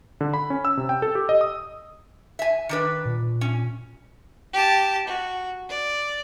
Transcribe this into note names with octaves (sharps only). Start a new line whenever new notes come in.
D3
B5
C#4
E6
C3
G5
A4
G4
D#5
D#6
E5 G#5
D#3 D4 B4
A#2
C#4
G4 A5
F#4
D5